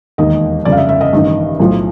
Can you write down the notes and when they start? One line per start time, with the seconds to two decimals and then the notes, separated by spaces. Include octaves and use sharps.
0.18 E1 D#2 D#3 D#5
0.65 G1 F2 C#3 D5
0.72 F5
0.77 E5
0.89 E5
1.01 D#5
1.13 A1 G2 D#3
1.60 B1 A2 F3